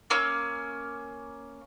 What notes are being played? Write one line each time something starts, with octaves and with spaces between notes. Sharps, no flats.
A#3 C#4 E6